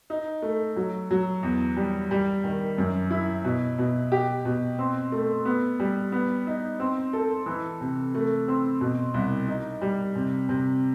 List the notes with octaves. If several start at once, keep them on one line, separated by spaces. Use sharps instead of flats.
D#4
A3
F#3
F#3
E2
G3
G3
D#3
F#2
E4
B2
B2
G4
B2
C4
A3
B3
G3
B3
D#4
C4
A4
E3
C3
A3
C4
B2
C2
D#4
G3
C3
C3